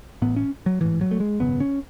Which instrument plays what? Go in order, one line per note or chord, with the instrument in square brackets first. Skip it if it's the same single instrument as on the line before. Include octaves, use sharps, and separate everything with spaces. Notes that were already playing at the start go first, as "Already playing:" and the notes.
[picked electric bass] A1 A2 B3
C#4
F#3
A1 G#2 E3
F#3
A3
G#3
G#1 F#2 C#3 B3
C#4